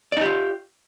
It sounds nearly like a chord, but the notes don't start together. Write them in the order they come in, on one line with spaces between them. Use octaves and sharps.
D5 D#4 G4 F4